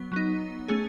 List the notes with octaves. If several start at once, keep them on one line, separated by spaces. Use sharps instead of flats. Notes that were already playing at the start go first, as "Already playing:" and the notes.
Already playing: F#3 B3
F#3 B3 D#4
A3 C#4 G#4